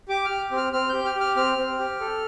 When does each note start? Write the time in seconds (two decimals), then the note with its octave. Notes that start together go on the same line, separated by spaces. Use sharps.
0.09 G4 D6
0.25 G4 F6
0.51 C4
0.57 F6
0.73 C4 F6
0.89 G4 G6
1.05 F6
1.15 G4
1.20 F6
1.36 C4 F6
1.58 C4
1.79 G4
2.01 A4